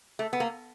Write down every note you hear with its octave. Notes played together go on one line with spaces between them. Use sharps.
A3
B3
A#3